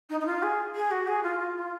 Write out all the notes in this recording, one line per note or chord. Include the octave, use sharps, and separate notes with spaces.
D#4
D#4
F4
G#4
G#4
F#4
G#4
F4
F4
F4